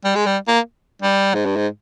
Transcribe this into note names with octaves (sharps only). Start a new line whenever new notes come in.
G3
G#3
G3
A#3
G3
G#2
G2
G#2